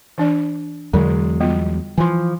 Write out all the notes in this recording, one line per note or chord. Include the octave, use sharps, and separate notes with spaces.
E3 D4 D5
E2 D3 F#3 G#3
G3 B3 F4
E3 F3 G#5 C6